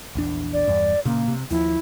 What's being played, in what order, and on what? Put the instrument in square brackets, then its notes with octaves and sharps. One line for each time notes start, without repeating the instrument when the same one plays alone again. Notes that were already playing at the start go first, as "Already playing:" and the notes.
[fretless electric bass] A#1 E2 D4
[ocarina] D5
[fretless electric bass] E2 G2
[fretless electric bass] A#2 C#3 [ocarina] A#3
[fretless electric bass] C3
[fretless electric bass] D#2 F3 [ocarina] E4